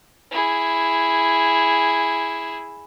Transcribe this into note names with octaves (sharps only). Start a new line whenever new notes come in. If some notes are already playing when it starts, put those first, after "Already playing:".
E4 G#4